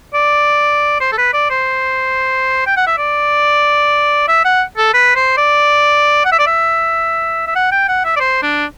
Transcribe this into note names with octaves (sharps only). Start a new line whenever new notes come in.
D5
C5
A4
B4
D5
C5
G5
F#5
E5
D5
E5
F#5
A4
B4
C5
D5
F#5
E5
D5
E5
E5
F#5
G5
F#5
E5
D5
C5
D4